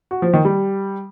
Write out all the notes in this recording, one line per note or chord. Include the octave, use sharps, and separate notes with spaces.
F#4
F3
D#3
G3